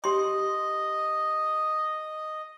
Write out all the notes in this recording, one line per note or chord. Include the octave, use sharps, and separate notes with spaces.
G4 D#5 C6